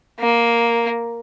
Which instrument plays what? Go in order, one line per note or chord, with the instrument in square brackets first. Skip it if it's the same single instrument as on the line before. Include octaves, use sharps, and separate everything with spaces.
[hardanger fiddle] A#3